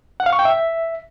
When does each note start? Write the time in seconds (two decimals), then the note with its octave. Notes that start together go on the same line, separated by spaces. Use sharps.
0.20 F#5
0.26 F5
0.33 C#6
0.39 G5
0.45 E5